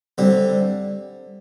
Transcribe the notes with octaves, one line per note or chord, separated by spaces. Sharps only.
D3 G3 C4